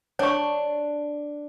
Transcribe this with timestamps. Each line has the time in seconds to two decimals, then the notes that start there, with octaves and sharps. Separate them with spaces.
0.19 D4 C#5 C#6